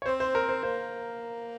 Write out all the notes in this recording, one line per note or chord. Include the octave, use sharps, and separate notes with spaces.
C#5
C4 C5
C5
A#4
C5
A#3 C5